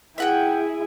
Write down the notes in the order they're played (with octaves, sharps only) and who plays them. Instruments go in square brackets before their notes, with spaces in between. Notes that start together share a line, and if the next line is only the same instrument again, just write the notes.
[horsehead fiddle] E4 G#4 [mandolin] E5 F#5 G5